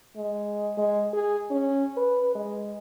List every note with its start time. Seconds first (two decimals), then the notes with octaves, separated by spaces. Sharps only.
0.16 G#3
0.77 G#3
1.13 G#4
1.50 C#4
1.97 B4
2.35 G#3